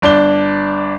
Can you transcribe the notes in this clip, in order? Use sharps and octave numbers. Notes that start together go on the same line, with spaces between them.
G1 D4 D5 G7